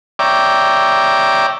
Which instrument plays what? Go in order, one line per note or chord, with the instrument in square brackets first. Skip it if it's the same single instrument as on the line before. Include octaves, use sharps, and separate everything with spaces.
[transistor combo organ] C#5 D5 E5 G5 A#5 D6